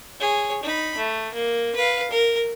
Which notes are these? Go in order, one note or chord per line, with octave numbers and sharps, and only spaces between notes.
G#4 C#5
D#4 B5
A3
A#3
B4 F5
A#4